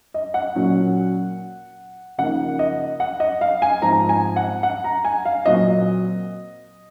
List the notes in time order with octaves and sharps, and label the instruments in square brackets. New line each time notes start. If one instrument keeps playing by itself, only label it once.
[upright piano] D#5
F#5
A#2 F#3 C#4
C#3 F3 A#3 D#4 F#5
D#5
F#5
D#5
F5
G#5
G#2 F3 G#3 C4 A#5
G#5
F#5
F#5
A#5
G#5
F5
A#2 F#3 C4 D#5